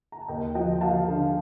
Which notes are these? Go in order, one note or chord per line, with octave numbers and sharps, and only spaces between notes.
A#5
A5
D#2 D#5 G5
F3 D#5 G5
F3 F5 A5
D3